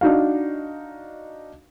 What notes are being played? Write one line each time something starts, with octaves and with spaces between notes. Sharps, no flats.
D4 D#4 F#4 F5